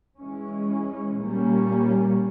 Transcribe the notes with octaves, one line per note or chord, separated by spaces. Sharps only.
E3 G#3 C#4
A#2 G3 A#3 C#4